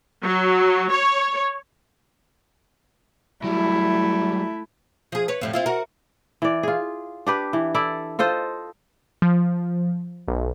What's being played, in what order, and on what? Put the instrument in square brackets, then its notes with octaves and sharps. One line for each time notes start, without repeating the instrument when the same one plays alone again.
[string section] F#3
C#5
[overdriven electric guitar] F#3 G3 [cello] A3 E4
[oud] F3 G#4
B4 C#5
F2 A2 G3
C4 E4 F4
F#4 A#4
[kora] E3 D5
F4 G#4
D4 G4 B4
E3
E4 A4 D5
F4 A4 C5 D#5
[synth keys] F3
B1